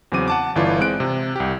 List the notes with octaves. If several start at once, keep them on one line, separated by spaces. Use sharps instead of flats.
E2 C#3 F#3 C4 D6 D#7
F#5 A5 D6
G1 E3 F4 D5
G#3 C4 F#6 D7
C3
C2 G4